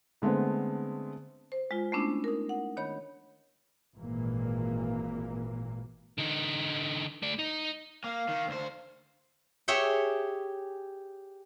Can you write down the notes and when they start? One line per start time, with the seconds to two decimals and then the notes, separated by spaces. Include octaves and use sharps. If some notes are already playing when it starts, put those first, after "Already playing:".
0.22 D3 G#3 A3 B3 C4
1.52 C5
1.71 G#3 F4
1.92 A3 B3 C#4 D4 E4
2.24 D#4 A#4
2.49 F#5
2.77 D#3 C#5 B5 G6
3.97 G#1 A#2 E3 A#3
6.18 D3 D#4
7.22 A3 D5
7.39 D#4
8.04 A#3 F5
8.28 D#3
8.47 D2 C5
9.68 G4 G#4 C#5 E5 G5